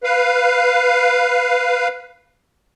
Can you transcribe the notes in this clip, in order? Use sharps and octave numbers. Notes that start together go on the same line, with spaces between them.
B4 F5